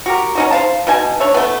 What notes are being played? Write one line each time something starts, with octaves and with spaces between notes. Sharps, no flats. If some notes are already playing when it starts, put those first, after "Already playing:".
F#4 G4 A#4
C#4 D#4 F#4
C5 F5 A5
B2 D#4 G#5 A5
D4 C#5 E5
A3 B3